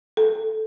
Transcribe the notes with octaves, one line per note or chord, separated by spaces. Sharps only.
A4